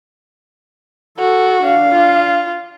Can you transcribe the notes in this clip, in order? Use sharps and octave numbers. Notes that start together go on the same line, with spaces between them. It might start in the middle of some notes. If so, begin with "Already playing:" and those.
F#4 A4
D4 F5
F4